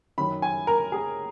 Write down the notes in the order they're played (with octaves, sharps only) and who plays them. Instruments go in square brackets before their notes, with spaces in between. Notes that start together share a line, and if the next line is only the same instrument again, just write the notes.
[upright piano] F#2 D#3 F#3 C#4 B5
G#5
A#4
G#4